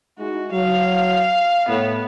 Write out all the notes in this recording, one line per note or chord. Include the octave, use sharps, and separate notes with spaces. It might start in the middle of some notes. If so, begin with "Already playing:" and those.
G#3 D#4 E4 F#4
F#3 F5
A2 B3